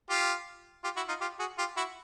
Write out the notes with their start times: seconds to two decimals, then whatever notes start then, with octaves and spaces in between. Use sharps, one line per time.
0.10 F4 G4
0.84 F4 G4
0.96 E4 F#4
1.08 D#4 F4
1.21 F4 G4
1.39 F#4 G#4
1.58 F4 G4
1.77 E4 F#4